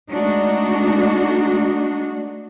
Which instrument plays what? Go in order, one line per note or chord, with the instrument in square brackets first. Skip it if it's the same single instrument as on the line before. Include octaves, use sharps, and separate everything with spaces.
[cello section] G#3 A3 D4 D#4 F#4